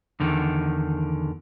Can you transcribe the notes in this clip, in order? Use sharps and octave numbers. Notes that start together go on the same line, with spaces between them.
E2 D3 D#3